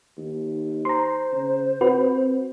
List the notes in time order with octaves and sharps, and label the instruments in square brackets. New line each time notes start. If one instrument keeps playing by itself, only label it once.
[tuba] D#2
[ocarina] C5 [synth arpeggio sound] A#5 C6
[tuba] C#3
[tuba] C4 [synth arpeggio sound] F#4 B4